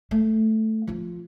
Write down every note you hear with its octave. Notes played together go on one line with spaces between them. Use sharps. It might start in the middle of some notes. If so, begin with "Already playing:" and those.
A3
F3 F4